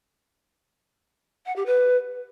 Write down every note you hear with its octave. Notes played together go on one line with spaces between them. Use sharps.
F#5
G4
B4